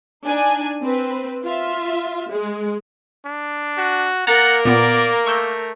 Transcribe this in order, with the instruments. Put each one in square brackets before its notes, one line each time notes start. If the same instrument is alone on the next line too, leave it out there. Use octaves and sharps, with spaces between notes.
[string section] D4 D#4 G#5
C4 B4
F4 E5
G#3
[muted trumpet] D4
[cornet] F#4
[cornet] A#3 [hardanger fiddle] A#4 [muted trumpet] F#5 [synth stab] A#5 A6 A#6
[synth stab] A#2 B3 [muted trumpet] D5
[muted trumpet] A3 [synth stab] C#6 E6 G6